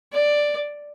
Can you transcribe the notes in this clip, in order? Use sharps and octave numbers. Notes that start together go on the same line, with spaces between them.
D5